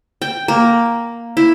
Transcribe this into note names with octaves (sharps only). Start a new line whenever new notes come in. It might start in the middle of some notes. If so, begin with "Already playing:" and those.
G5
A#3
E4